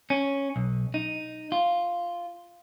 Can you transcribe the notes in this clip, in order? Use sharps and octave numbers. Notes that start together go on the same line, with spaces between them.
C#4
B1
D#4
F4